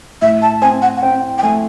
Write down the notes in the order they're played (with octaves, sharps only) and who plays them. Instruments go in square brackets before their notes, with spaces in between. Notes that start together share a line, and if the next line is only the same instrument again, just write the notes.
[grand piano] A2 [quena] E5
[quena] A5
[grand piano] C4 [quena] G#5
[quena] F#5
F#5
[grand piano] C4 [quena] G5
[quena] G5
[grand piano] A3 [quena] G#5